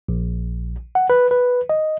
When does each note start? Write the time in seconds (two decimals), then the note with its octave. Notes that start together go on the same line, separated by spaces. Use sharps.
0.09 A#1
0.95 F#5
1.10 B4
1.31 B4
1.69 D#5